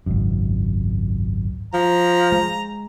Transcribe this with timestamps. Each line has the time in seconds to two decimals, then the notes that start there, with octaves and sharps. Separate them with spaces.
0.06 G#1 C#2 F#2
1.74 F3 A#5
2.32 G#3